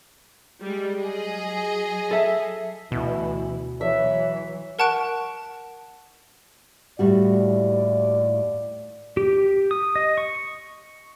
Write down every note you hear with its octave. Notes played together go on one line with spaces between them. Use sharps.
G3 G#3
F#3 G#4 D#5
A4 E5
D2 B2 E3 E4
E3 F#3 C#5 E5
A#4 F#5 A5 C#6 F#6 D7
D#2 A2 G3 E4 F#4 D5
G4
D#6
D#5
C#6